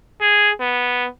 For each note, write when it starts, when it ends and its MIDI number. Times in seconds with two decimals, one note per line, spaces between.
0.21 0.50 68
0.60 1.06 59